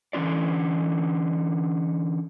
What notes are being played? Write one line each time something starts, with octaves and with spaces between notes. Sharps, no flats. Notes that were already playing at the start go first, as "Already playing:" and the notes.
D3 E3 C#4 F4 D5